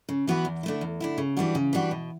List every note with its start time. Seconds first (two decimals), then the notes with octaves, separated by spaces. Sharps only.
0.09 C#3
0.27 E3 B3 F#4 B4
0.45 E2
0.63 D3 A3 E4
0.81 E2
1.00 D3 A3 E4
1.18 C#3
1.37 E3 G3 D4 F#4
1.55 C#3
1.73 E3 G3 D4 F#4
1.91 B2